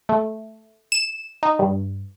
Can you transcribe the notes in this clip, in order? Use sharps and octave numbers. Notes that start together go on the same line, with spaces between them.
A3
E7
D#4
G2